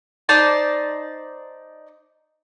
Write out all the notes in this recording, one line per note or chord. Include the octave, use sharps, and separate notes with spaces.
D#4 C5 D5 A5